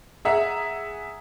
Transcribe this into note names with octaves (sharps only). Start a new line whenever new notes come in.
G#4 E5 F#5 A#5